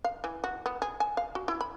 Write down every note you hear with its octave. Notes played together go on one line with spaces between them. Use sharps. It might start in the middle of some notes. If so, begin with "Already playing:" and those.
F5
E3
F#4
B3
G#4
G#5
F5
F#4
E4
B5